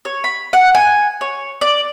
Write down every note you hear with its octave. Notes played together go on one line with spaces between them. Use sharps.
C#5
B5
F#5
G#5
C#5
D5